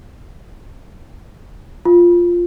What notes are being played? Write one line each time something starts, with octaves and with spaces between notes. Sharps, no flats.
F4